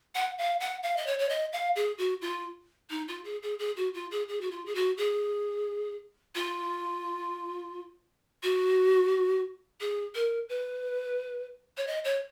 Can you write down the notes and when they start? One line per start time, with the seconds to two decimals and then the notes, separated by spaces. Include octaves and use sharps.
0.15 F#5
0.38 F5
0.60 F#5
0.83 F5
0.97 D#5
1.07 C#5
1.19 C#5
1.29 D#5
1.53 F5
1.76 G#4
1.98 F#4
2.21 F4
2.90 D#4
3.08 F4
3.24 G#4
3.42 G#4
3.59 G#4
3.77 F#4
3.94 F4
4.11 G#4
4.28 G#4
4.41 F#4
4.51 F4
4.66 G#4
4.75 F#4
4.97 G#4
6.35 F4
8.43 F#4
9.80 G#4
10.15 A#4
10.49 B4
11.77 C#5
11.87 D#5
12.04 C#5